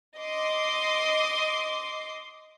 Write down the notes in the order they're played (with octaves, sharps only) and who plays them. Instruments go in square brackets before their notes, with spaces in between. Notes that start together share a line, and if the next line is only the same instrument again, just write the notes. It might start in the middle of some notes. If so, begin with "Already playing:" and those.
[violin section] D#5 C6 D6